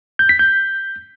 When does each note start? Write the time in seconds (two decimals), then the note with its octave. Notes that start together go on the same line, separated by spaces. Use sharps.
0.19 G6
0.29 B6
0.39 G6